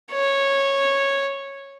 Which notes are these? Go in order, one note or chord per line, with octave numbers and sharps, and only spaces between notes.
C#5